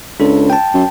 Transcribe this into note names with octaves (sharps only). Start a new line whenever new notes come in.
C#2 D4 A4
G5 A5
F#2